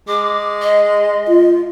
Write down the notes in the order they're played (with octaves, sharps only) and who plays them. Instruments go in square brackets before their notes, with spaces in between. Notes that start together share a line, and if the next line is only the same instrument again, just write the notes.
[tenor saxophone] G#3 [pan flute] D6
[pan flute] D#5
[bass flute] F4